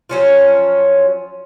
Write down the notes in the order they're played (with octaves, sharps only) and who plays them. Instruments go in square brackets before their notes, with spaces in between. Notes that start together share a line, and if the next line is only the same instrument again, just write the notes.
[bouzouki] F3 F#3 C#4 F4